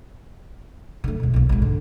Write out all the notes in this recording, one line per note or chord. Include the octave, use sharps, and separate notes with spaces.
D3 A3
C#2 B2
B1 A#3
G#1 G#2
D3